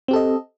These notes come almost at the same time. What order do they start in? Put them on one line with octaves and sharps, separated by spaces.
C4 G4 A4 D#5